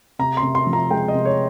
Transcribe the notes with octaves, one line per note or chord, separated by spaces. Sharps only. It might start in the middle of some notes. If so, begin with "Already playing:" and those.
C3 A#5
C6
C3
C6
F3
A#5
G#3 G5
D#5
C3
C#5